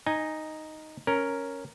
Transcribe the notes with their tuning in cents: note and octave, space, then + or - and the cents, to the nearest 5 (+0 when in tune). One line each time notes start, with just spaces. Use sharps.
D#4 +0 G#5 -10
C#4 +0 A#4 +0